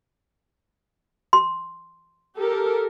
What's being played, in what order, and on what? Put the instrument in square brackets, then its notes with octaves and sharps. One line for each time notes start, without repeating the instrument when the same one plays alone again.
[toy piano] C6
[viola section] G4 A4 A#4